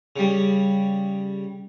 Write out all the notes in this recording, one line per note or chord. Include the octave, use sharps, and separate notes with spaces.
C#3 G3